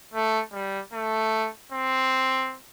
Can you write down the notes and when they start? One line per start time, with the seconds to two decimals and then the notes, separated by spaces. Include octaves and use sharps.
0.13 A3
0.53 G3
0.93 A3
1.72 C4